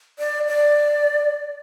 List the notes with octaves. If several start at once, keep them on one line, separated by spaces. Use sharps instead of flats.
D5
D5